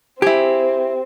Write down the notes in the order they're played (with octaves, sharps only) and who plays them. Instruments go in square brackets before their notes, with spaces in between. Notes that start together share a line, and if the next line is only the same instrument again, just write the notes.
[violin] C4 [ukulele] E4 G#4 [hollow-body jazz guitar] G4